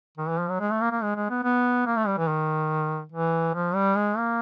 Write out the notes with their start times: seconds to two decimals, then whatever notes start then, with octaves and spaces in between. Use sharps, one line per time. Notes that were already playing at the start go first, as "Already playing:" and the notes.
0.18 D#3
0.29 E3
0.39 F3
0.50 F#3
0.60 G#3
0.71 A3
0.81 A#3
0.92 A#3
1.03 G#3
1.16 G#3
1.30 B3
1.43 B3
1.86 A#3
1.96 A3
2.07 G3
2.18 E3
2.28 D#3
3.12 E3
3.54 F3
3.74 G3
3.96 G#3
4.17 A#3